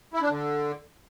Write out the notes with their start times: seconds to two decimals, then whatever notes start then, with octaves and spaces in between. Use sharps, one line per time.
0.14 E4
0.22 D4
0.30 D3